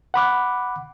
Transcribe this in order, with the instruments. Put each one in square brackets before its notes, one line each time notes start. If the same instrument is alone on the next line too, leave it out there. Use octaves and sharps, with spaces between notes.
[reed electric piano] F#5 B5 D6 F#6